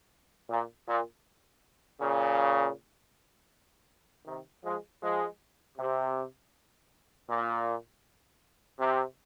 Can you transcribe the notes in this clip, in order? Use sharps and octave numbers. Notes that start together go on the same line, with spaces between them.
A#2
A#2
A#2 C#3
C3 D#3
F3 G#3
F3 G#3
C3
A#2
C3